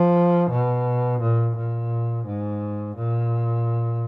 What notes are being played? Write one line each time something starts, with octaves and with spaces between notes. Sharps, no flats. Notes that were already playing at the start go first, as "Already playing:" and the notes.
Already playing: F3
B2
A#2
A#2
G#2
A#2